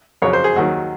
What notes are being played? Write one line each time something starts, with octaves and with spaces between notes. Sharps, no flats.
F2 C#3 F#3 C#5
C5
G#4
D#2 D#3 F#3 F#4